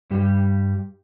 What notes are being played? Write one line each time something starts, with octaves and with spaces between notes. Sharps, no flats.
G2 G3 G4